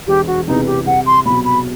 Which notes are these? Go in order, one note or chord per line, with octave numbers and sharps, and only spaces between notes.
E1 G4
F#4
E2 C3 E3 D#4
G4
C2 F#5
C6
B2 F#3 B5
B5